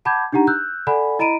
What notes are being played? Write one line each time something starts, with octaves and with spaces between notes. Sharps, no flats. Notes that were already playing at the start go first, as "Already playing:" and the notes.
F#5 A5 B5 D6 G6 G#6
D4 D#4 G4 F#5 A#5
E6 F#6 G6
A4 D5 F#5 G#5 B5
E4 D#5 A#5 B5 D7 D#7